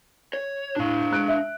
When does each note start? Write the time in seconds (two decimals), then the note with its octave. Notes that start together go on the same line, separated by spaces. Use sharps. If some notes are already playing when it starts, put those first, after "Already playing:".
0.33 C#5
0.76 A2 D4 E4 F5
1.11 G#3 F#6 D7
1.28 E5